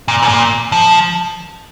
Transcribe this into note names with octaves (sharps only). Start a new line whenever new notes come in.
A#2
G#2
A#2
F3